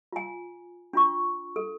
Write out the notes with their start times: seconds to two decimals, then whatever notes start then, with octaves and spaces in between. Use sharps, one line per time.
0.12 F4 G#5
0.93 D4 F4 C#6
1.56 A4